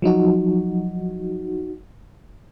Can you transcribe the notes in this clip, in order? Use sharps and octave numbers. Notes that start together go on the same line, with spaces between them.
F3 F#3 D#4 F#4